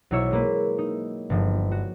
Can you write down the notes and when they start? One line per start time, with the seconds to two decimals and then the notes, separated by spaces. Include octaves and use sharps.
0.11 B1 F#3 E4 C#5 E6 C#7
0.31 G#3 A#3 B4
0.78 D#4
1.30 G1 F3
1.71 F#4